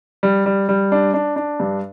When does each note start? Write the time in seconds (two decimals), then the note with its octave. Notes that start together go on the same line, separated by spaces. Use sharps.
0.23 G3
0.46 G3
0.69 G3
0.92 D4
1.14 D4
1.36 D4
1.60 G2